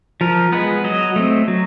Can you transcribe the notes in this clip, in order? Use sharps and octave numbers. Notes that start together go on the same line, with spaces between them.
F3 A#4
G#3 B3 B4
F#3 D#5
A3 C4
F#3